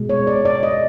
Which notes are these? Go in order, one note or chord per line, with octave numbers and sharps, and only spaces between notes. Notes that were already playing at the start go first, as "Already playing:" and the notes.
Already playing: B2 G#3
C#5
D5
D5
D#5